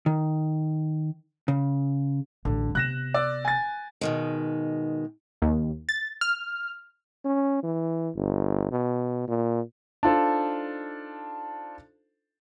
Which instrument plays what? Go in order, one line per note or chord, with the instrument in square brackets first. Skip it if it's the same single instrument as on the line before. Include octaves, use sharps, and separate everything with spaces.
[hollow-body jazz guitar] D#3
C#3
[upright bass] A1 D4 [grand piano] D3
[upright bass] C3 B3 [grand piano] F#6 A#6 E7
[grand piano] D5 E6
G#5 A6
[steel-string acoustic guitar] B2 D#3 G#3
[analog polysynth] D#2
A6
F6
[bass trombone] C#4
E3
G1
B2
A#2
[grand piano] D4 D#4 F4 A4 C5